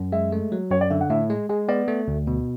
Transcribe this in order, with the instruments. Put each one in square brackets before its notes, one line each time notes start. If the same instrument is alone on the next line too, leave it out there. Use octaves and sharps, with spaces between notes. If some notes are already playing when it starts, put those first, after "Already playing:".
Already playing: [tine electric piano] F#2
[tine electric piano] G#3 [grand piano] E5
[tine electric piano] A3
F#3
[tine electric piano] F#2 [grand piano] C#5
[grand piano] D5
[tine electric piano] D3 [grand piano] E5
[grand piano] F#5
[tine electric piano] A2 [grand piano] E5
[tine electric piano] G#3
[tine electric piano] G#3 [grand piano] G#4
[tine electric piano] B3 [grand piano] D5
[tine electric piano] A3
D2
B2